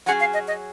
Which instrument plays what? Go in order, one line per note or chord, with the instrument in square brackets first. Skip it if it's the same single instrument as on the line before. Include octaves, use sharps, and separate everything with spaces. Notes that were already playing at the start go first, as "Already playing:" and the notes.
[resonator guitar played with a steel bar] F#3 C#4 G#4 [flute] F#5
[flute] F5
D#5
D#5